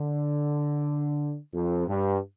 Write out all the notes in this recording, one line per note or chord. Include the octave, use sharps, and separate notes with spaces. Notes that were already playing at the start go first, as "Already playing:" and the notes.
Already playing: D3
F2
G2